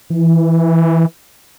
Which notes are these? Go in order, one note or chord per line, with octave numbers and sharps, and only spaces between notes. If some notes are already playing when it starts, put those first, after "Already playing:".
E3